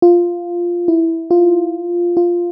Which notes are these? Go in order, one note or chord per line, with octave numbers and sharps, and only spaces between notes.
F4
E4
F4
F4